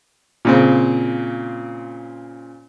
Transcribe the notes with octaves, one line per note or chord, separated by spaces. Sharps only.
A#2 C#3 C4